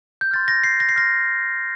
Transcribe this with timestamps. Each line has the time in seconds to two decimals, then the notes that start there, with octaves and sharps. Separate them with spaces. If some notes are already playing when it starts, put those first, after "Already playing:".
0.21 G6
0.31 C6 F6 A6
0.48 A#6
0.64 C7
0.80 A#6
0.89 C7
0.96 C6 F6 A#6